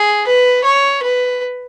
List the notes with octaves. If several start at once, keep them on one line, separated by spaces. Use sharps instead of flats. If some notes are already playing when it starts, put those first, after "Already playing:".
Already playing: G#4
B4
C#5
B4